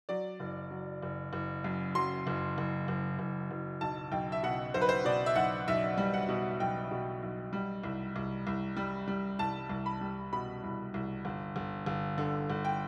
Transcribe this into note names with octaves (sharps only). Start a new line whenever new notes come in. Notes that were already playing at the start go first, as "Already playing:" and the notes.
F#3 D5
F#1
F#3
F#1
F#1
F#2
F#3 C6
F#1
F#1
F#1
F#1
F#1
B1 A5
B1 G5
E5
B2 F#5
B1 C5
B4
C5
B2 D5
E5
B1 F#5
B1 E5
G3
F#5
B2
B1 G5
B2
B1
G3
C2
C2
C2
G3
G3
C2 A5
C2
B5
G3
B2 B5
C2
C2
G1
G1
G1
D3
G1
G5